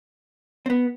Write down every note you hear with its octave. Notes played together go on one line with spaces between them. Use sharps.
C4
B3